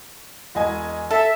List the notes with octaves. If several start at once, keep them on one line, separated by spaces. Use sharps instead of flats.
E1 D#5 G#5
A4 E5